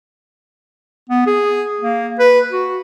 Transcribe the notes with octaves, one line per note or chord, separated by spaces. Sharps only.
B3
G#4
A#3
B4
F#4